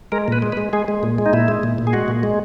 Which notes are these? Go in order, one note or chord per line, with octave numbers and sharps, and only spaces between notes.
G#3 A#4
A#2 B4
G#3
B4
G#3
G#3 G#4
G#3
A#2
G#3
D#4
A#2 E4
G#3
A#2
A#2
G#4
G#3 F#4
A#2
G#3